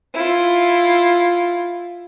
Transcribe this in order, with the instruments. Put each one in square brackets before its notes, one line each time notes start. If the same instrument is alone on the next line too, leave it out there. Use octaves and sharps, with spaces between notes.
[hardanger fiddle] E4 F4